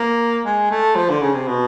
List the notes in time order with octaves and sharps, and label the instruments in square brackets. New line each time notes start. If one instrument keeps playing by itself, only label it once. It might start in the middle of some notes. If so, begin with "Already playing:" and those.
Already playing: [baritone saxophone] A#3
G#3
A3
F3
D3
C#3
C3
B2